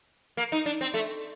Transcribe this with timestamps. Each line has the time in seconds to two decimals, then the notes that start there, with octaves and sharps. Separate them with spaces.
0.37 A#3
0.52 D#4
0.66 D4
0.81 C4
0.94 A3